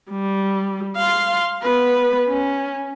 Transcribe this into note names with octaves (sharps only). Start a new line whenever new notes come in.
G3
F5 C6
B3 B4
C#4